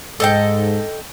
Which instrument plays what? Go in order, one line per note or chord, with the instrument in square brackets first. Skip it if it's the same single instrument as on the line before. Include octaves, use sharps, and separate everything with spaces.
[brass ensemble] G#2 [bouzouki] A4 D#5 G5